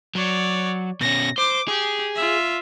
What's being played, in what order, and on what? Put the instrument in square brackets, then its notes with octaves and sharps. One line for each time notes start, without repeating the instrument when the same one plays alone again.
[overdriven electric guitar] F#3 [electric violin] C#5 D5
[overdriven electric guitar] B2 C#4 [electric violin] A#6
[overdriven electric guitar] C5 [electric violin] D6
[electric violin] G4 [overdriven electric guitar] G#4
[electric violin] F4 E5